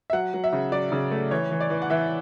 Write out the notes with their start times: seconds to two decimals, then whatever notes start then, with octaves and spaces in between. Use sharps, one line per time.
0.10 E5
0.13 F#3 F#5
0.34 F#3
0.44 E5
0.53 C#3
0.72 F#3 D5
0.92 C#3
1.11 A3
1.31 E3 C#5
1.51 E3
1.60 D5
1.70 E3
1.82 F#5
1.90 E3 E5